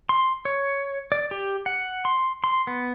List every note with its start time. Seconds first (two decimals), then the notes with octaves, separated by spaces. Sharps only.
0.09 C6
0.45 C#5
1.12 D5
1.31 G4
1.66 F#5
2.05 C6
2.44 C6
2.67 B3